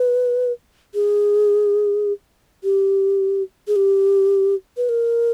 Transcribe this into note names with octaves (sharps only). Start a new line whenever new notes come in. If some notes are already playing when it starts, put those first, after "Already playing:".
Already playing: B4
G#4
G4
G#4
G4
B4
A#4